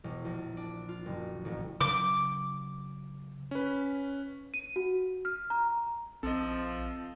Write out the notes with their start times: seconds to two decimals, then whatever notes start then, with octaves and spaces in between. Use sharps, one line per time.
0.04 E1
0.25 A#1
0.57 D4
0.89 F4
1.06 F#1
1.45 A1
1.81 C#3 F#3 D6
3.51 C#4 B4
4.54 D#7
4.76 F#4
5.25 F6
5.50 A#5
6.23 A#1 F3 C4 A4 D#5